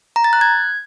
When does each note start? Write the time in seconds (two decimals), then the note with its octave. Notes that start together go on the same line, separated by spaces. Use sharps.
0.16 A#5
0.24 A6
0.33 F#6
0.41 G#6